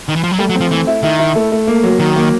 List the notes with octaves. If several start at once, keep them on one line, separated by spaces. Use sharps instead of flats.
D#3
E3
F3
F#3
G3 A3
F#3
C4
F3
E3 A3
E4
D#3 E4
E4
A3
A3
A#3
F#3
D#3 F#3
A#3